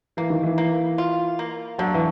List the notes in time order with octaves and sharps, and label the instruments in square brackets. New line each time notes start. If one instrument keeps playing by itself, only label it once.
[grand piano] E3 [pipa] A#3
[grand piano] D#3
E3
[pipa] A#3
F4
A#3
[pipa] D3 [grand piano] F#3
[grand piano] E3